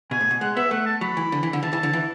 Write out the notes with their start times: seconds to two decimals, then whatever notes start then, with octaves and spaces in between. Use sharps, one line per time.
0.11 B2 G#5
0.21 A2
0.31 B2
0.41 G#3 F#5
0.57 B3 E5
0.71 A3 F#5
0.86 A5
1.01 F#3 B5
1.17 E3
1.32 D3
1.43 E3
1.53 D3
1.63 E3 A5
1.73 E3
1.83 D3
1.93 E3